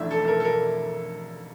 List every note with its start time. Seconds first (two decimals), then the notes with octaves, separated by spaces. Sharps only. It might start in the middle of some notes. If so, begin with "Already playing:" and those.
Already playing: F1 F2 E3 A3 D4 E5
0.11 A4
0.24 A4
0.28 A#4
0.40 A4
0.45 A#4